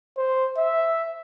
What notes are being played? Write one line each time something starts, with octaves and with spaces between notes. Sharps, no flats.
C5
E5